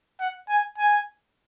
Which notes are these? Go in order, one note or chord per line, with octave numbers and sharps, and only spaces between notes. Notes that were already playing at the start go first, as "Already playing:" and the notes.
F#5
G#5
G#5